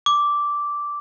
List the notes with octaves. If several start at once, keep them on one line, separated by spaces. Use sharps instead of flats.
D6